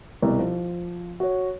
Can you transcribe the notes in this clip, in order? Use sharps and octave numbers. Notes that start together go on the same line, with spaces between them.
C2 B2
F3
F#4 C#5